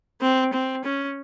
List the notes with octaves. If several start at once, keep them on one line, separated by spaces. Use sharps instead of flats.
C4
C4
C#4